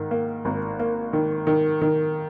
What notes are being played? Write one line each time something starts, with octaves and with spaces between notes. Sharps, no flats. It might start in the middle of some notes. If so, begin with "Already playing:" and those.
Already playing: G#2 D#3
A#3
G#1
A#3
D#3
D#3
D#3